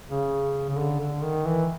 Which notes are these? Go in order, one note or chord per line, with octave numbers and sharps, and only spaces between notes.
C#3
C#3
D3
D3
D#3
E3